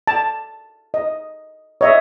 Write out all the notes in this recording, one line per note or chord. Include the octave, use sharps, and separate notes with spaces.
A5
D#5
C#5 D#5 E5